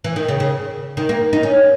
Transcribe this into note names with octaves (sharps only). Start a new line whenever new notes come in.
E3
D#3
C#3
C#3
D#3
A#3
D#4
C#4